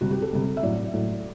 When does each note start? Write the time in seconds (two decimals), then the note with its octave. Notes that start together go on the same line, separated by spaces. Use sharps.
0.01 C3 G3 F#4
0.11 G4
0.22 A4
0.33 C3 G3
0.57 E5
0.63 A2 F#3 D5
0.93 A2 F#3